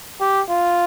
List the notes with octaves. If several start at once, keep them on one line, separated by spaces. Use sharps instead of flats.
G4
F4